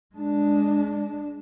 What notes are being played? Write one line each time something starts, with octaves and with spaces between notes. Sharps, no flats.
G#3 D4